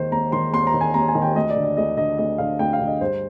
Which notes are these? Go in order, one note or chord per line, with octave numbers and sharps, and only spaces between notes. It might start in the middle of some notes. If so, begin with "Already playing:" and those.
Already playing: D#2 D#3 C5
D#2 A#5
D#3 C6
D#2 C6
A#5
D#3
G#5
D#2 A#5
G#5
D#3
G5
D2 D#5
D5
D3
D5
D2 D#5
D3 D#5
D2 D#5
D3 F5
D2 G5
F5
D3
D#5
G2 C5